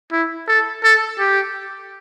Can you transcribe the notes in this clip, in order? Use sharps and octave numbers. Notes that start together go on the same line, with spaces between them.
E4
A4
A4
G4